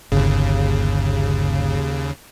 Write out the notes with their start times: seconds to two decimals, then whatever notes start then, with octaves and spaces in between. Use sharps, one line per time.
0.12 G1 D#2 C#3